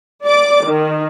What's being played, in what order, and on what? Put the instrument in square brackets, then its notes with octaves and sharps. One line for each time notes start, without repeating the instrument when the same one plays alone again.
[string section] D5 D6
D#3